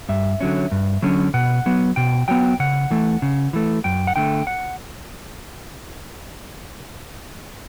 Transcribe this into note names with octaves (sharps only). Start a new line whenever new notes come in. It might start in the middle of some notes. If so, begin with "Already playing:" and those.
G2 E5
D3 F#3 C#4
G2
D3 F#3 C#4
B2 F#5
F#3 B3
B2 G5
F#3 B3 G5
C#3 F#5
E3 A3
C#3
E3 A3
F#2 G5
F#5
D3 A3 G5
F#5